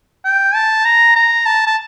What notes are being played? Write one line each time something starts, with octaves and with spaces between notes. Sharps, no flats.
G5
A5
A#5
A#5
A5
A5